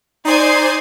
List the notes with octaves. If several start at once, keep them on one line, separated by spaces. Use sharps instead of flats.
D#4 C5 D5 G#5 C7